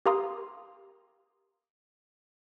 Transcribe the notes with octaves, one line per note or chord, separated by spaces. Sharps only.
G4 A#4 F5 A#5 C6 D#6